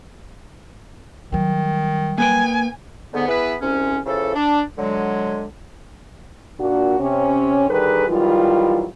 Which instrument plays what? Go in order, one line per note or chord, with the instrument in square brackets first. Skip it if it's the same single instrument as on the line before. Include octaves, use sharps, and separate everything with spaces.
[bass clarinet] D#3 [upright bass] F#3 G3
[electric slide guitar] A#3 B4 G5 [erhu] G#5
[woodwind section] G#2 D3 B3
B3 E4 G#4 B4
C2 G#2 C3 C#4
C#3 E3 F3 A4
D4
D3 F#3 G#3
[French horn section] A#2 D4 F#4
C3 C#4
D3 D#3 G3 G#4 A#4 B4
D#3 E3 F#3 G3 F4